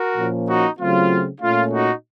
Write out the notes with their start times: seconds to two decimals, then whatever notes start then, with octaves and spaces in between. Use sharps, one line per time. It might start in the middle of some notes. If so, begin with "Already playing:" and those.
Already playing: F#4 A#4
0.16 A#2 F3 A#3 C#4
0.48 D#4 F#4
0.79 C#3 F#3 A3 C4 F4
1.41 A#2 A3 C#4 F4
1.71 D#4 F#4